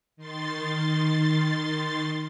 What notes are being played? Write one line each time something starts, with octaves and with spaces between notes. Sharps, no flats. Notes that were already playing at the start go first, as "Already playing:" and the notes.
D#3 C6 A6